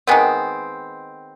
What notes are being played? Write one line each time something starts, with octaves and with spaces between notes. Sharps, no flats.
D#3 G#3 B3 C4